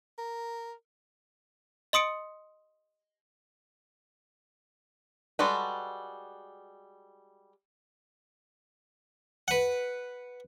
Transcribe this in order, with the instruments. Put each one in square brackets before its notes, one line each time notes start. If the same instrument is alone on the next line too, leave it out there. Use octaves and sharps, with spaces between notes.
[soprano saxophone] A#4
[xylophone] D#5 C6 D#6 C#7 D7
[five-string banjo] G3 G#3 F#4 A4 B4
[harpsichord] B4 F#5